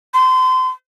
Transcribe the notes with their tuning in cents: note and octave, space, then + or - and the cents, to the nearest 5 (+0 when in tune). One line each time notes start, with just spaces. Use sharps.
C6 -30